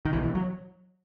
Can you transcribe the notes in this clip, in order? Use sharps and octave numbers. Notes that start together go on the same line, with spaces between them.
D#3
B1 B2 E3
E3
F#3